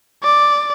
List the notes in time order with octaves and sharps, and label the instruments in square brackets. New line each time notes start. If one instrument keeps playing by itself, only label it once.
[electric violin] D5